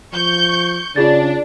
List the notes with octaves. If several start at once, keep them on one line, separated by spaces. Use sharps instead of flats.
F3 C#6 G6
C#3 D4 F4 G#4 A6